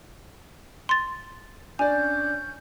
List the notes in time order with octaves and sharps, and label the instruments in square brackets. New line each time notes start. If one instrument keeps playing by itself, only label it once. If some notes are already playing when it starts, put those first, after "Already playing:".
[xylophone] C6 A6
[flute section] C#4 G6 [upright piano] D4 D5 [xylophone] G#5